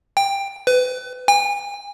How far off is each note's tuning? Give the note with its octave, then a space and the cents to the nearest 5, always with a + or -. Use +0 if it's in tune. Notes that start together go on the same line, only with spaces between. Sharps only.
G5 +15
B4 +30
G#5 -40